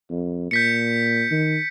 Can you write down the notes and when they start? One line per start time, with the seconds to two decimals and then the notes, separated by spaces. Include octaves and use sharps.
0.10 F2
0.51 A#2 G6 B6 C#7
1.31 D#3